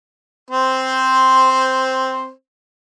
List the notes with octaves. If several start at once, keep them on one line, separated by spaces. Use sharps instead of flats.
C4 C5